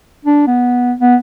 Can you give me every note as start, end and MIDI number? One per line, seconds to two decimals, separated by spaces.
0.25 0.45 62
0.47 0.93 59
1.00 1.16 59